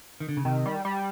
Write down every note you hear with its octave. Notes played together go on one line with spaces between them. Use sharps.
D#3
D3
C#3
C3 D#3
G3
G3